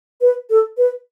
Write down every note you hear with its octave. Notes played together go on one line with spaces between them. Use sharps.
B4
A4
B4